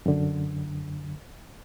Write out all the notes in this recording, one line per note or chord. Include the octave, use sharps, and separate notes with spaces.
F#2 D3